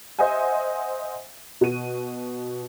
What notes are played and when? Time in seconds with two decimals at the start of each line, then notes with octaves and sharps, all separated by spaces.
0.19 C5 D#5 E5 F#5 G#5
1.61 B2 F#4 D#7